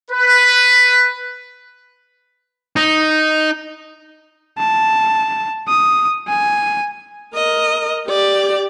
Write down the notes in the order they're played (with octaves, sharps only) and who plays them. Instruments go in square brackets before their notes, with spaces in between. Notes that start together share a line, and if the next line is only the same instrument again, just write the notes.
[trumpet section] B4
[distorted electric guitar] D#4
[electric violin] A5
D#6
G#5
[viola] A#4 D#5
G4 D5